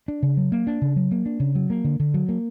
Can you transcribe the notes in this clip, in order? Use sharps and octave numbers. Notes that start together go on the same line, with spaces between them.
D4
C#3
F#3
A#3
D4
C#3
F#3
A#3
D4
C#3
F#3
A#3
D3
D3
F#3
A#3